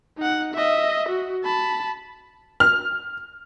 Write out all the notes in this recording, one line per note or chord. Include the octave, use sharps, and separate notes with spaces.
D#4 F#5
D#5 E5
F#4
A5 B5
F6